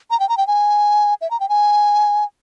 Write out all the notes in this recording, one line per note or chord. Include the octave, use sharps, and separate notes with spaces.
A#5
G5
A#5
G5
G#5
E5
A#5
G5
G#5